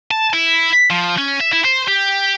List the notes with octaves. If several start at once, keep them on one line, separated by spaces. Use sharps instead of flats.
A5
E4
F3
C#4
E5
E4
C5
G4